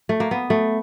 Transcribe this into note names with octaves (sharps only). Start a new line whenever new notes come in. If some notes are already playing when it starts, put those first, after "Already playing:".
A3
A#3
B3
A3